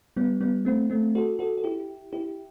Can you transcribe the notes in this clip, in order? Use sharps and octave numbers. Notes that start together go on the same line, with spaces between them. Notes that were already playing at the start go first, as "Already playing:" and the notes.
G3 B3
G3 B3
A3 C4
A3 C4
F#4 A4
F#4 A4
A4
E4 G4
E4 G4